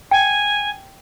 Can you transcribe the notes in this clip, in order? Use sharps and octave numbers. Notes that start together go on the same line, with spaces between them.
G5 G#5